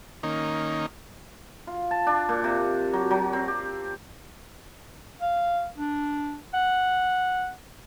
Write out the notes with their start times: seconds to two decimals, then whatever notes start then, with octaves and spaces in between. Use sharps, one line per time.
0.23 D#3 A#3 C#4 D#4
1.67 F4
1.91 A5
2.07 D4
2.29 A#2
2.44 C3
2.93 F#3
3.11 F#3
3.33 C4
3.48 G4
5.21 F5
5.78 D4
6.54 F#5